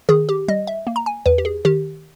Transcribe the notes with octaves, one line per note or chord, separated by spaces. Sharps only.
D#3 G#4
G4
G3 D#5
E5
A#3
A#5
G#5
E2 B4
G4
G#4
D#3 G4